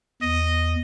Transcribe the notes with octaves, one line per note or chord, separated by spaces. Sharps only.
E2 D#5